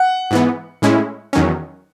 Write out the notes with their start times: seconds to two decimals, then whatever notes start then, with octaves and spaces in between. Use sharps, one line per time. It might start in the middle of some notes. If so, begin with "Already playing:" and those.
Already playing: F#5
0.31 G#2 E3 B3
0.82 A2 G#3 C#4 E4
1.33 E2 D#3 F#3 C#4